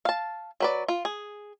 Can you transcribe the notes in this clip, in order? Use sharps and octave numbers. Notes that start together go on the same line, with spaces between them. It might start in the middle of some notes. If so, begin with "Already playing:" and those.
F5 A5
F#3 B4 D5
F4
G#4